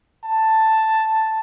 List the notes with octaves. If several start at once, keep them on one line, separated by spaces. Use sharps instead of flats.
A5